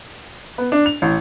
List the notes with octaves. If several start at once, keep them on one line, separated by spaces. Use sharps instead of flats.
B3
D4
F7
A1